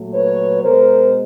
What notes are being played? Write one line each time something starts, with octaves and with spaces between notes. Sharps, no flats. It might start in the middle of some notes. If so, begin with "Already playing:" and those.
Already playing: A#2 F#3 A3
B4 C#5
B2 G#3 A#4 C5